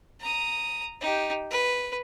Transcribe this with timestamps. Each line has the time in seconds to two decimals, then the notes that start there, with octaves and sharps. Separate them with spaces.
0.21 A#5 D#6
1.01 D#4 G4
1.51 B4